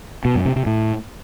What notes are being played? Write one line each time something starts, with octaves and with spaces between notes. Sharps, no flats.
B2
F#2
C3
C3
A2